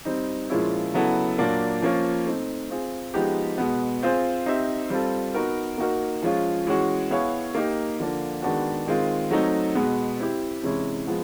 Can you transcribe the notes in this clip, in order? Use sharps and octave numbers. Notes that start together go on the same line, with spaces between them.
G3 C4 D#4
A#2 F3 G#3 C#4 E4
C#3 F#3 B3 E4 A4
A#2 F#3 A#3 D4
F3 A#3 C#4 F4
A3 C4 D#4
C4 F4 G#4
F3 G#3 B3 D#4 G4
B2 G#3 B3
C4 F4 G#4 C5
C4 D#4 G4 C5 E5
G3 C4 F4 A4
B3 D#4 F#4 A#4
A#3 D#4 F#4 A#4
F3 G#3 C#4 F4
E3 G#3 C#4 F#4
B3 E4 G#4 C#5 F5
A#3 D#4 G4
D3 F3 A#3 D4 F4
D#3 G#3 B3 D4 F#4
D#3 G#3 C4 F4
F#3 A3 C4 D#4
B2 G#3 B3
C4 E4 G4
C3 E3 G#3 C#4 E4
F3 G#3 B3